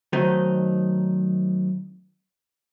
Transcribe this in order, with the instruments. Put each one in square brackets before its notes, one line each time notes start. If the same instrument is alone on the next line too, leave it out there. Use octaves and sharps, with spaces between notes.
[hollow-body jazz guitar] D#3 F#3 A3 C4 D#4